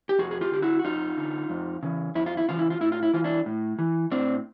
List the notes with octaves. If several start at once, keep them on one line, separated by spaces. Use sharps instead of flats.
G4
F2 F#4 G#4
G#4
F4 G4
D3 G4
E4 F#4
F#4
F2 D#4 F4
D3
F2
C#3 E3
F2 E4
F4
E4
C#3 E3 F4
E4
F4
A2 E4
F4
E4
E3 F4
D4 E4
A2
E3
A2 C4 D4